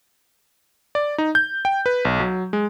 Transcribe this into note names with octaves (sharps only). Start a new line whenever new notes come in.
D5
D#4
G6
G5
B4
B1
F#3
G#3